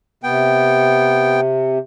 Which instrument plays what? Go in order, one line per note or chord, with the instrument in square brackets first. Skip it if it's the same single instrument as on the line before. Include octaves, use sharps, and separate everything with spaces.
[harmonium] C3 [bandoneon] B3 G5